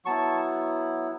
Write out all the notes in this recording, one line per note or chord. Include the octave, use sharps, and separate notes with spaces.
F#3 B3 E4 A5 C#6